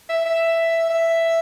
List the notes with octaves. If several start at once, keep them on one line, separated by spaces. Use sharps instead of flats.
E5
E5
E5